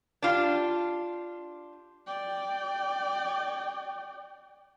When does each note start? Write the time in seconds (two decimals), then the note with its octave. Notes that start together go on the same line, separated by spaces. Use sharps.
0.22 D4 F4 G4
2.06 D5 G5